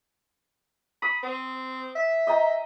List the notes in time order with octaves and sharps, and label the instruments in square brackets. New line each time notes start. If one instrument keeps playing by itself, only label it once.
[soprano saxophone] B5 [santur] D#6
[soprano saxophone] C4
E5
[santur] D#5 G5 A#5